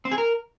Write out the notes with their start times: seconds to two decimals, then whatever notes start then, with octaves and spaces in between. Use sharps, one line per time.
0.05 C4
0.12 G#4
0.18 A#4